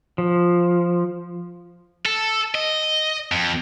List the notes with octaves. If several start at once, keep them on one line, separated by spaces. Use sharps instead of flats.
F3
A4
D#5
F2